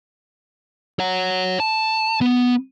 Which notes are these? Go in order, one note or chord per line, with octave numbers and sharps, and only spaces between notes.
C#5 F#5
A5
B3